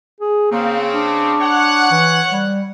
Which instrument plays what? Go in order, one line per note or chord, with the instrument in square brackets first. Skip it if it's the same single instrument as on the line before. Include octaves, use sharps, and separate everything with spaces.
[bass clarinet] G#4
[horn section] C#3 C4 [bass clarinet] A#3
[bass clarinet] D4
[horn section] C#5 F#5
[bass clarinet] E3
G3